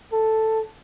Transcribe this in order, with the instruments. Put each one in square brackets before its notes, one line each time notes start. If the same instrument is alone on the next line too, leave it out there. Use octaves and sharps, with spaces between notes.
[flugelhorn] A4